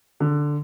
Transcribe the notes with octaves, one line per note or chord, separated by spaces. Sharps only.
D3